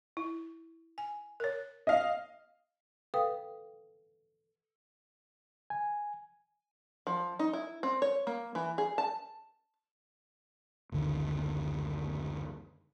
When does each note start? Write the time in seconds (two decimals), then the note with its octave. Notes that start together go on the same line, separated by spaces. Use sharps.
0.17 E4
0.98 G#5
1.40 A#4 C#5
1.87 D#5 F5
3.14 A4 B4 F5 G5 D#6
5.70 G#5
7.07 F3
7.39 D#4
7.53 E4
7.83 C4
8.02 C#5
8.27 A#3
8.55 E3
8.78 G#4
8.98 A5
10.92 F#1 D2 D3 D#3